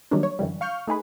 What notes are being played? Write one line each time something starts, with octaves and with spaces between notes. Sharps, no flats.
D#3 F#3 G3 A#3 C#4 D4
C#5
F#2 D3 E3 G3
F5 C#6 F6 G6
A3 D#4 G#4 B4